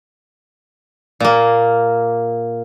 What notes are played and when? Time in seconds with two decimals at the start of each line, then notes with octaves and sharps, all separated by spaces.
1.20 A#2 A#3